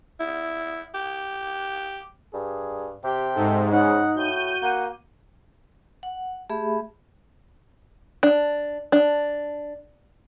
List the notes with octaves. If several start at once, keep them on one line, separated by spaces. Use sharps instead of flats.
E4
G4
G2 G#4
C3 G4 G5
G#2 A4
C#3 D#4 F#5
A2 F#4 G6 D#7
A#3 F#5
F#5
A3 G4 G#4 E5 B5
D4
D4